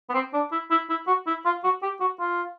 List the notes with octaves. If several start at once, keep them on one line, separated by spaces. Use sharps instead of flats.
B3
C4
D4
E4
E4
E4
F#4
E4
F4
F#4
G4
F#4
F4